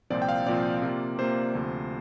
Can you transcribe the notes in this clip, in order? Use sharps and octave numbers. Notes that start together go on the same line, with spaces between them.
C2 A#2 F3 C4 D5
G5
F5
C2 A#2 F3 C4 D5
C3 A#3 F4
C3 A#3 F4 C5
D2 C3 F3